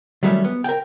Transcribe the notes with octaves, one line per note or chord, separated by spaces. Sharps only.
D#3 F#3 G3 A3 C#4
B3
A#4 G5